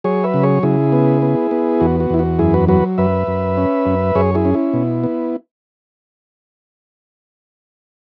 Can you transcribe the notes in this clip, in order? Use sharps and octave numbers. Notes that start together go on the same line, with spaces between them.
F#3 G#4 C#5
B4 E5
C#3
G#4 C#5
C#3 E4 G#4
B3
B3
B3
E2 F#4
F#4
E2 E4
F#4
F#2 E4 G#4
F#4 B4
F#3 F#4 B4
F#2 B4 E5
F#2
C#4
F#2
F#2 G#4 C#5
E4 G#4
C#4
E4
B2
B3